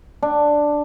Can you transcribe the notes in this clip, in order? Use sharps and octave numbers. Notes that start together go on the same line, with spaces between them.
D4